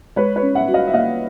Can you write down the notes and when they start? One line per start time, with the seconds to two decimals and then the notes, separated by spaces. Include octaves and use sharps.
0.16 G#3 B4 C#5
0.36 B4 C#5
0.42 C#4
0.55 E5 F#5
0.68 F#4
0.74 D#5 F5
0.87 E5
0.94 A#3 D#5 F5